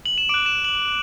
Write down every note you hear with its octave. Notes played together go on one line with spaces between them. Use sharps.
F#7
E7
D6 F#6 D7
E7
F#7